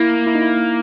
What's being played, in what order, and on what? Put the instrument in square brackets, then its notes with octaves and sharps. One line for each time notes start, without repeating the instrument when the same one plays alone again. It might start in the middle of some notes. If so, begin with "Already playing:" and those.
Already playing: [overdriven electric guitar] A#3 [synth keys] E4
[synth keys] E4
D#4
E4